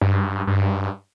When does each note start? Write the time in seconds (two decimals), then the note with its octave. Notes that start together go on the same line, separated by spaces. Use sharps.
0.01 G2
0.47 G2